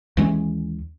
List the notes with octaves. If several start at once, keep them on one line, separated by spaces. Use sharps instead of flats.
D#2 E3 G#3 C#4